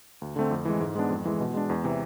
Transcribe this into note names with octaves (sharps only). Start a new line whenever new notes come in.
D2
D3 A3 C4
F2
E3 G#3
G#2
G#3 B3 D4
F2
E3 G#3
B2
G#3 D4
E2
C3 E3